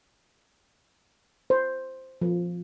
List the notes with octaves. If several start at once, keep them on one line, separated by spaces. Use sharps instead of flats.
C5
F3